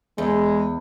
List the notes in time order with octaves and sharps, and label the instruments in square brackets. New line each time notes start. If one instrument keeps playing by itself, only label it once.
[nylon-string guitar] E2 [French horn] G#3